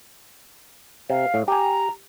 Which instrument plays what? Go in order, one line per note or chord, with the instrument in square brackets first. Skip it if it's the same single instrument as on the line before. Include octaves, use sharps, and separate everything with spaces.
[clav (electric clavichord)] C3 [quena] F5
[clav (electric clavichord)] A2
[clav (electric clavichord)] G4 G#5 [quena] A#5